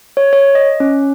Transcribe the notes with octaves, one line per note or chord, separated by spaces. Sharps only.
C#5
C#5
D#5
C#4